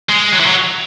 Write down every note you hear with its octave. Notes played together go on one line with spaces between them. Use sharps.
G#3
F#3
E3
F#3